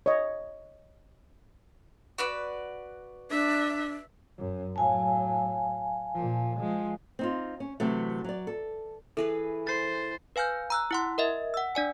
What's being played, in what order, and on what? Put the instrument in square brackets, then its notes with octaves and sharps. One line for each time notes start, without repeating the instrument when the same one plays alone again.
[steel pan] C#5 D#5
[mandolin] F#4 B4 D5
[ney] D4 [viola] E5
[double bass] F#2
[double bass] A2 F#3 [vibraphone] F5 G#5 A5
[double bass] A#2 F3
F3 G#3
[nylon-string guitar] C4 D#4 F4
C#4
C3 E3 F#3 A3
F#3 D5
A4
[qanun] E3 G#4 B4 [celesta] A4
[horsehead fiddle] C5 [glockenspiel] A6 C7
[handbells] B4 F5 G#5 F6 G6
A#5 E6 F#6
E4 F#5 C6
A#4 D#5 E5
F#5 E6
D4 D5 G#5